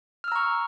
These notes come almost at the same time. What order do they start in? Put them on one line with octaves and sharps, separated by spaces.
F6 E6 A#5 C#6